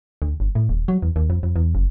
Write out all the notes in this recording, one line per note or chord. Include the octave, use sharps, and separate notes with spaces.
D2
G1
A2
D#1
F#3
E2
D#2
F2
F2
E2
F#1